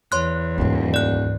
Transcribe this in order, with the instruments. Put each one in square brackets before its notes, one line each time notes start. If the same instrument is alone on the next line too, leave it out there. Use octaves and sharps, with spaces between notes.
[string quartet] E2 [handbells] C#5 C6 F#6
[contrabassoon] D#1 [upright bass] D2 G#2
[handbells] D5 F#6